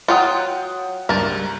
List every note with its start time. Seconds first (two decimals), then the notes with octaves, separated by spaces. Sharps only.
0.08 F#3 F4 F#5 G5 D#6
1.09 C#2 G2 A#4 A5